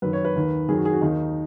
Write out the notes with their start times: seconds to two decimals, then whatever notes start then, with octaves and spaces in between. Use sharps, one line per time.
0.02 F#2 D#3 B4
0.13 C#5
0.25 B4
0.36 D#2 D#3
0.68 F#2 D#3 G#4
0.77 F#4
0.85 G#4
0.93 F#4
1.01 D#2 D#3 D#4